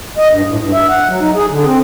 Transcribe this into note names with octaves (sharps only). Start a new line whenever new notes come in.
D#5
G2
A2
G2
E5
F#5
F#3
D#4
G#4
D3
C4